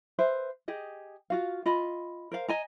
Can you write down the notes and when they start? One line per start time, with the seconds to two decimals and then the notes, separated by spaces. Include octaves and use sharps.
0.19 B4 C5 E5
0.68 G4 G#4 D#5
1.30 F4 F#4 F5
1.66 F4 D#5 B5
2.32 A#4 C5 F5
2.48 D#5 G#5 A#5